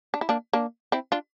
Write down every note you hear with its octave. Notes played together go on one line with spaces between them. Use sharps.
D4
E4
A#3 D4
A#3 D4
C4 E4
D4 F4